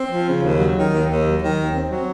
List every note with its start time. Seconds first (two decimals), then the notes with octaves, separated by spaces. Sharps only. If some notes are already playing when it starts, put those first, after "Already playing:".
Already playing: C4
0.09 F3
0.27 C#3
0.42 D#2
0.58 F#3
0.75 D#3
0.92 D#2
1.08 D#2
1.24 F#3
1.40 D#3
1.56 D#2
1.73 C4
1.89 F#3